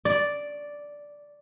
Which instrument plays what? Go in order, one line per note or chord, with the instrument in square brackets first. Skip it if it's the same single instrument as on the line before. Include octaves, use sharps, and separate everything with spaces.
[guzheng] D5